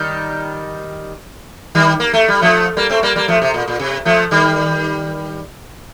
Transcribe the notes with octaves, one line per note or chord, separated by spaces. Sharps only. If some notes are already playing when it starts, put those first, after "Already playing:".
Already playing: D#3 G3
D#3 G3
A#3
A3
G3
F3 A3
G3 A#3
A3 C4
G3 A#3
G3 A#3
F3 A3
C3
A#2
A#2
C3
F3 A3
D#3 G3